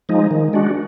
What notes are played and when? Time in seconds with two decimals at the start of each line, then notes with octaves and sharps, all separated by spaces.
0.09 F3 G#3 D#4
0.31 D#3
0.53 G#3 D4 F#4